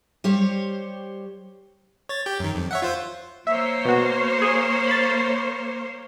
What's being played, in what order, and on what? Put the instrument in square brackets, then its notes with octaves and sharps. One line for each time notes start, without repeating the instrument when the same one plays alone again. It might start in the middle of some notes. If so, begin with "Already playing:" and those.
[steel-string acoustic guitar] G3 G4 C5 C#5
[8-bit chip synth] C#5 A6
G4 G6
F#2 D#3
F2
C#5 E5 F#5
F4 C5
[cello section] A#3 C5 C#5 [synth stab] E5
[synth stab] B2 F#4
G#4
B5 A6